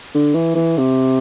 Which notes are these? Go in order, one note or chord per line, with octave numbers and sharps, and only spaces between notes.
D3
E3
E3
C3